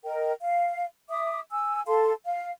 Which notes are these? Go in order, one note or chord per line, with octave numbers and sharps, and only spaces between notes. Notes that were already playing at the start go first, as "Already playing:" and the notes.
A#4 D#5 G5
F5
E5 D6 D#6
G#5 E6
A4 F5 A5 C6
F5